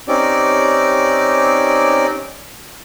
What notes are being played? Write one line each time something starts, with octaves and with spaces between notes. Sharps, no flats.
C4 C#4 D#4 G4 D5